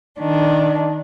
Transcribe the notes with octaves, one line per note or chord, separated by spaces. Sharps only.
D#3 D4